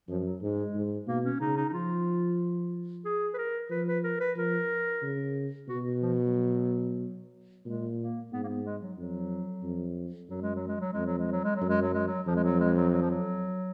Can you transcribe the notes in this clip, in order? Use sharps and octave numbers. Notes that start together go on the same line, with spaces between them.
F#2 F3
F#3
G#2 G#3
G#2
B2 A#3
C#4
C#3 D#4
D#4
D#4
F3 F4
G#4
B4
A#4
F3 B4
B4
A#4
B4
F3 A#4
C#3
B2 F#4
F3
F#3
A#2 G#3
A#3
G#2 B3
A#3
B3
G#3
F#3
F2 F#3
F2
F#2 F#3
G#3
F#3
G#3
F#3
F2 G#3
F#3
G#3
F#3
G#3
F#3
F#2
G#3
F#3
G#3
F#3
F2 F3
G#3
F#3
G#3
F#3
F#3
F3
F#3